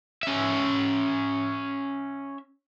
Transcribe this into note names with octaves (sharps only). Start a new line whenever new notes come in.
C#4 E5